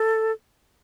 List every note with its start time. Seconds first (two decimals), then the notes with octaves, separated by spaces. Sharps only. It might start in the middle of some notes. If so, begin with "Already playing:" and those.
Already playing: A4